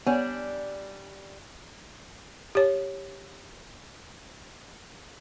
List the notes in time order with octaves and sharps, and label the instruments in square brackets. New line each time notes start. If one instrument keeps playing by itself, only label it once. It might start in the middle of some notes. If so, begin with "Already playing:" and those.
[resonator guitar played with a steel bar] G3 D4 G#5 [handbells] B3 C#5
[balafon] G4 C#5